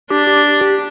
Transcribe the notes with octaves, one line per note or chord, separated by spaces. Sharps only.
D4 G4
G4
G4